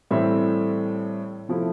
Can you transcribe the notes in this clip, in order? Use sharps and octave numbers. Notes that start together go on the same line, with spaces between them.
A2 E3 G3 C4 E5
C3 F3 A3 E4